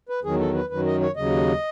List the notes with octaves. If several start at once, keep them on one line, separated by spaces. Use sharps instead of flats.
B4
E2 D#3 F#3 G#4
A4
B4
F#2 D#3 F#3 B4
D#5
C#5
D#2 C#3 F#3 D#5